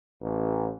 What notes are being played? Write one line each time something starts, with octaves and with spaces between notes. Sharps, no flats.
A1